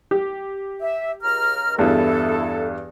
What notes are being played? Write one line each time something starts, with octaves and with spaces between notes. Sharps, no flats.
G4
E5
C#2 A#5 F6
E2 G2 E4 G#4 A4